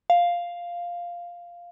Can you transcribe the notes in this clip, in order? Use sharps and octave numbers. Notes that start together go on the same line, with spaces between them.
F5